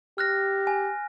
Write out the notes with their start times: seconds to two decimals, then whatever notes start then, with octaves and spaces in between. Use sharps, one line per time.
0.18 G4 F6 F#6 A#6
0.67 G#5